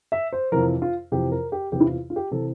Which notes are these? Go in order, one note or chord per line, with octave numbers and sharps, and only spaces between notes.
E5
C5
F2 C3 E3 A#4
F4
F2 C3 E3 G4
A#4
G4
E2 C3 E3 G4
E4
F4
F4
G4
C3 E3 A4